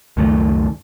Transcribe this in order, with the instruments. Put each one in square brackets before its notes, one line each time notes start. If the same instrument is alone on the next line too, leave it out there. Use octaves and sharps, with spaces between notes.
[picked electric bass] C#2 F#2 D#3 A3